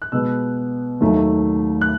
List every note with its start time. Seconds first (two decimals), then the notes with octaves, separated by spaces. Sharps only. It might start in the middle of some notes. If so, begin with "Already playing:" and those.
0.02 F#6
0.12 B2 G#3 B3 E6
1.01 D#2 D#3 F#3 A3
1.81 F#6